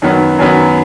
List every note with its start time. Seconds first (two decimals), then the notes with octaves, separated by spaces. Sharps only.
0.02 F#2 D#3 F#3 B3
0.39 F#2 D#3 F#3 B3